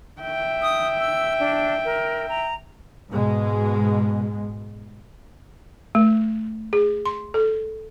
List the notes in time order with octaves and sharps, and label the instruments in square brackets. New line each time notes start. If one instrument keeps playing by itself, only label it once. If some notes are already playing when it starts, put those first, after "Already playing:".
[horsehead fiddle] E5 G5
[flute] D#6
E6
D4
A#4
A#5
[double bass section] G#2 B2 G#3
[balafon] A3
G#4
C6
A4